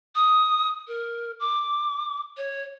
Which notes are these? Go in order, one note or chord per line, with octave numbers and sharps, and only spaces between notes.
D#6
A#4
D6
C#5